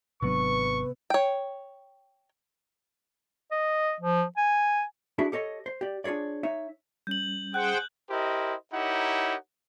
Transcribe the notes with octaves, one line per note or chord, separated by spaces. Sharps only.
G#1 C3 F#3 B3 D4 B4 C#6
C#5 G5
D#5
F3
G#5
D4 E4 F#4 G#4 E5
G4 A4 C#5 D#5
C5
G4 D5
D4 F4 G#4 C#5 D5
D#4 C#5 E5
G3 C#4 G6 F#7
G#4 C5 F#5 G5 F#6 G6
E4 G4 A#4 C5 D#5
D#4 E4 G4 A#4 C#5 F#5